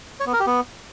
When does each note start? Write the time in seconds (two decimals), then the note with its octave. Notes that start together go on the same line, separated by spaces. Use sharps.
0.20 C#5
0.27 B3
0.33 A#4
0.40 G4
0.47 B3